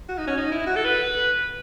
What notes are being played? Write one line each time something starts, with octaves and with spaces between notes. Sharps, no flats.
F#4
D#4
C#4
D#4
E4
F#4
A4
B4